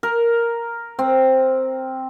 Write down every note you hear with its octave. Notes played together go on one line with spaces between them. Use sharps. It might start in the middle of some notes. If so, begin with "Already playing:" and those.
A#4
C4